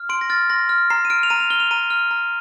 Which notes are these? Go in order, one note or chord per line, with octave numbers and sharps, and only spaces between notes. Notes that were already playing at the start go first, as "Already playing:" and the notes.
Already playing: F6
C6 D7
A#6
F6 A6
C6 A#6
F6
A#5 C7
D#7
F6 D7
F7
A#5 D#7
F7
F6 G7
F7
A#5 D#7
F6
A#5